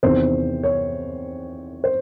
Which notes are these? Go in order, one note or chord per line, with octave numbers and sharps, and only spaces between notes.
E2 C3 D#3 C5
C#5
C5